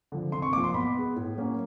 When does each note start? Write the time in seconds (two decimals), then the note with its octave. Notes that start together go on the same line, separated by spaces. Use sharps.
0.12 D3 F3
0.32 C3 C6
0.42 C#6
0.52 A#3 D6
0.57 F3
0.64 C6
0.73 B2 B5
0.95 G#3 B3
1.16 A2
1.37 F#3 A#3 C#4